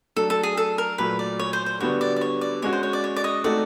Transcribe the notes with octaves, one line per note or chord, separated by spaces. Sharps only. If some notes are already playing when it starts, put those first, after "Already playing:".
F#3 A3 D4 A4
A4
G#4
A4
A#4
A#2 F#3 A3 B4
D5
C#5
C5
C5
D3 G3 B3 D4 F#4 C#5
D5
D5
C#5
D5
G#3 C#4 F#4 C#5
C5
C#5
D5
C#5
D5
C#5 D#5
A3 C4 D#4 F#4 A4 D5